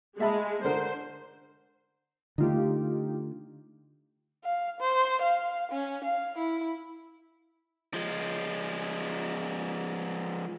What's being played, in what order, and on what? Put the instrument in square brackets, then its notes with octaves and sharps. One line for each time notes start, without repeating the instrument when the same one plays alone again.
[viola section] G#3 [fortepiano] E5 A5 B5
[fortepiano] D3 A#4 [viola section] C5
[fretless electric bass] D3 A3 [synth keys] D#4 F4 G4
[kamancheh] F5
C5
F5
C#4
F5
E4
[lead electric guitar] F3 G#3